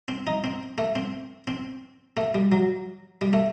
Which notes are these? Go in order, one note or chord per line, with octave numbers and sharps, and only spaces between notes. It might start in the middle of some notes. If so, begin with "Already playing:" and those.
C4
D#4
C4
A3
C4
C4
A3
G3
F#3
G3
A3